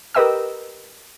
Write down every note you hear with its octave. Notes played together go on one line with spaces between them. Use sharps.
G4 A#4 B4 D#5 G5 E6